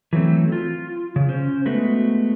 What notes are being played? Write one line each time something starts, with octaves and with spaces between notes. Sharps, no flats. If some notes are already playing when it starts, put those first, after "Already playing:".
E3 F#3 A3 C4
F4
C#3
C#4 C5
G#3 A3 B3 F#4